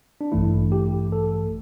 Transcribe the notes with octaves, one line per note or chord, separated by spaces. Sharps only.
D4
A1 G2 E3 A3 E4
G4
A4